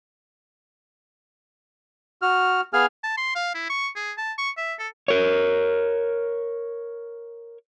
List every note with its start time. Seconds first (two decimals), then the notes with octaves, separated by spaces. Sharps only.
2.22 F#4 F6
2.73 B3 G#4 F5 G#5 F6
3.03 A5
3.17 C6
3.35 F5
3.55 E4
3.70 C#6
3.96 G#4
4.18 A5
4.38 C#6
4.57 E5
4.79 A4
5.08 A#4 C#5